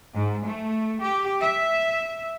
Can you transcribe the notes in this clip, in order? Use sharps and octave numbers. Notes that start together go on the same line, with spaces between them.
G#2
A3
G4
E5